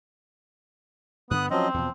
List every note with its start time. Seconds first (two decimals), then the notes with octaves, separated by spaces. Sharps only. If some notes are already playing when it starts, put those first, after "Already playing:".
1.31 G2 D3 B3 D#6 F#6
1.51 F3 F#3 C4 C#4 D#5
1.74 E2 B2 F3